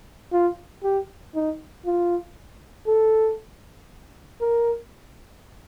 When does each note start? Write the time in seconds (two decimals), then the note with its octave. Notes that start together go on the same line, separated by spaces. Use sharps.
0.32 F4
0.83 G4
1.35 D#4
1.86 F4
2.87 A4
4.41 A#4